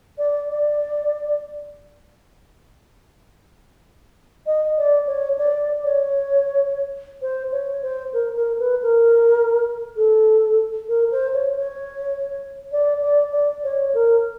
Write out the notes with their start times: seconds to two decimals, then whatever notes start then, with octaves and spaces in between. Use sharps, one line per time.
0.18 D5
0.50 D5
4.46 D#5
4.78 D5
5.07 C#5
5.38 D5
5.84 C#5
7.22 C5
7.52 C#5
7.82 C5
8.13 A#4
8.36 A#4
8.59 B4
8.82 A#4
9.96 A4
10.88 A#4
11.12 C5
11.34 C#5
11.57 C#5
12.72 D5
13.02 D5
13.32 D5
13.64 C#5
13.94 A#4